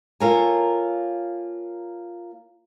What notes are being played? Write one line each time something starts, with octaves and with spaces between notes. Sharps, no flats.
A#3 F4 A4 A#4 C#5 G#5